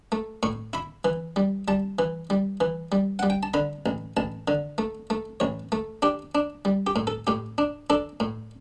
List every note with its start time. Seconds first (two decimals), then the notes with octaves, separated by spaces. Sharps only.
0.12 A3
0.43 A2 C#6
0.73 E4 B5
1.05 E3
1.36 G3
1.68 G3 A5
1.99 E3
2.30 G3
2.61 E3
2.92 G3
3.19 G3 F#5
3.30 G5
3.43 A5
3.54 D3 B5
3.86 A1
4.17 A1 A5
4.48 D3
4.78 A3
5.10 A3
5.40 A1 C#5
5.72 A3
6.02 D4 G4
6.35 D4
6.65 G3
6.87 G4
6.96 A2
7.07 A4
7.27 A2 G4
7.58 D4
7.90 D4 A4
8.20 A2